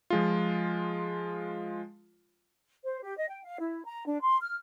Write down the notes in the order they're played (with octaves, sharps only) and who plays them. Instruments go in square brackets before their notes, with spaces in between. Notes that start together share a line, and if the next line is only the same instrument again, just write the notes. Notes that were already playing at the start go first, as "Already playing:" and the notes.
[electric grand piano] F3 G#3 F4
[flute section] C5
G4
D#5
G5
F5
E4
A#5
D4
C6
F6